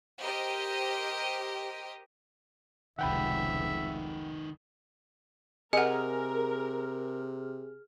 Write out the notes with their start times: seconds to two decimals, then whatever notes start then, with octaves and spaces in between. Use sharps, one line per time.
0.21 G4 A#4 C5 D#5
2.99 F1 C#2 D#3 B4 E5 F#5 G5 B5
5.73 C3 G#4 A#4 D#5 F#5 F6